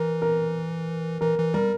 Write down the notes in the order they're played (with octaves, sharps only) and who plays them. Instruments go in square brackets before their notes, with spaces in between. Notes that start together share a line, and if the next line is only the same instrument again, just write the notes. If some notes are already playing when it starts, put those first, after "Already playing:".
Already playing: [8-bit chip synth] E3 [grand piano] A#4
[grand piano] A#4
[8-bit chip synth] E3 [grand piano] A#4
[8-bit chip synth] E3
[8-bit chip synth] G3 [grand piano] A#4